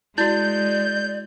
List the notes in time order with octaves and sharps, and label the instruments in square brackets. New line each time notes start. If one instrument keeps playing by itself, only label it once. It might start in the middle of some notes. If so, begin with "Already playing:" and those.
[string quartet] G#3 [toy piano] E4 F#4 [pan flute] D5 [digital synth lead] G6